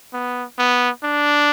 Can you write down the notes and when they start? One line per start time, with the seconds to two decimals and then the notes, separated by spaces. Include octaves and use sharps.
0.13 B3
0.58 B3
1.04 D4